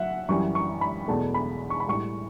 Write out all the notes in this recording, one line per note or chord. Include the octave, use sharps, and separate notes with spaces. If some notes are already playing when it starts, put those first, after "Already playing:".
Already playing: F#3 E5 F#5
F#2 E3 G3 C#6
C#6
B5
E2 B2 A3 A5
B5
C#6
B5
A2 G3 C#6